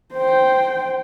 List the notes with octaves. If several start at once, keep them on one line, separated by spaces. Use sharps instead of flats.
C5 G5